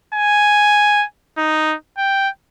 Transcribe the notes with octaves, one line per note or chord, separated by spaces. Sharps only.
G#5
D#4
G5